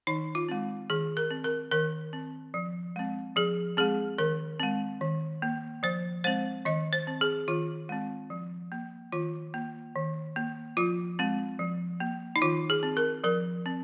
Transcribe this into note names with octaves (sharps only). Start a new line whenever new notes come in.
D#3 D#4
F4
G#3 C4
D#3 G#4
A#4
C4
A#4
D#3 A#4
C4
F3
G#3 C4
F3 G#4
G#3 C4 G#4
D#3 A#4
G#3 C4
D#3
A#3
F3 C5
G#3 C4 C5
D#3 D#5
C5
C4
G#4
D#3 F4
G#3 C4
F3
A#3
D#3 F4
A#3
D#3
A#3
F3 F4
G#3 C4
F3
A#3
D#4
D#3 F4
G#4
C4
A#4
F3 A#4
C4